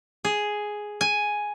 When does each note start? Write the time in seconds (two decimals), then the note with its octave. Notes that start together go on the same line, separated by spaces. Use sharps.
0.25 G#4
1.01 G#5